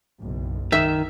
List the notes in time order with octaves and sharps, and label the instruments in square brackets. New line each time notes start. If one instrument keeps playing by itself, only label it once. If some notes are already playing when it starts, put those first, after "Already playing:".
[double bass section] F#1 B1
[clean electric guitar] D#3 [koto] E5